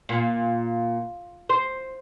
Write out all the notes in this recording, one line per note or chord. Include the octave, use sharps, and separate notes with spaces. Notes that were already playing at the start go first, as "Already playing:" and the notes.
A#2
C5